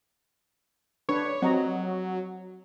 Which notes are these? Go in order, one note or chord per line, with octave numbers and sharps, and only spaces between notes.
D4 B4 C#5
F#3 C4 D#5 A#5